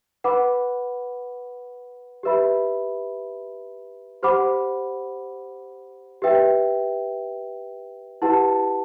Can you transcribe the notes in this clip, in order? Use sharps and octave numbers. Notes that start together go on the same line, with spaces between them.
B4 F#5 B5 D6
G4 B4 E5 B5
G4 C5 F#5 B5 D6
G4 B4 E5 G5
E4 G4 B4 F#5 A5